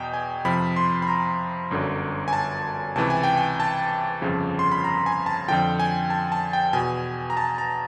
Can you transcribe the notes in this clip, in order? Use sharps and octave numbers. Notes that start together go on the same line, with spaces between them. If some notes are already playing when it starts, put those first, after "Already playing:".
Already playing: E2 B2 D#5 G5
G#5
F2 C3 F3 B5
C6
B5
A#5
G1 F#2 D3
G#5
A5
C#2 C3 E3 A5
G#5
G5
G#5
A5
G1 F2 C#3 F3
C6
B5
A#5
G#5
A5
F2 D3 F3 G5
G#5
A5
A5
G5
E2 B2 G#5
A#5
A5
A#5